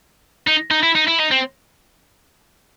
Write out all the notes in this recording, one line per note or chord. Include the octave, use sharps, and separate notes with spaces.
D#4
D#4
E4
D#4
E4
D#4
C4